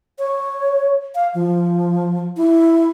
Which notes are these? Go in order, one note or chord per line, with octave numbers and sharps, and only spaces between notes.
C#5
F5
F3
E4